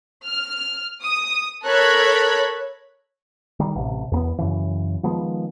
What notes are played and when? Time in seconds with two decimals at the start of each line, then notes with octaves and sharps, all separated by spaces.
0.23 F6
1.03 D#6
1.64 A4 A#4 C#5 B5 F#6 G#6
3.60 D#3 G3
3.75 A1 C3
4.12 E2 A#3 B3
4.38 F#2 C#3 E3
5.03 D#3 F3 G#3 B3